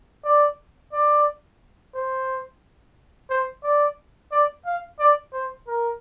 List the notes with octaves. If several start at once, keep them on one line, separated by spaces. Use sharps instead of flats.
D5
D5
C5
C5
D5
D5
F5
D5
C5
A#4